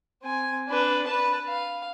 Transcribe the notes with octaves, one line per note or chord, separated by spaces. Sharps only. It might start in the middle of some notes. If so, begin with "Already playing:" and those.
C4 G#5
D4 B4
B4 A5
F5